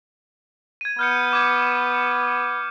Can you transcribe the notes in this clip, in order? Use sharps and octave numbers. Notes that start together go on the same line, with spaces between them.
G#6 D#7
B3 F6 G6 C#7
D6 G#6